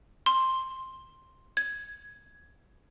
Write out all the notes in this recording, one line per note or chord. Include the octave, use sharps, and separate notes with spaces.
C6
G#6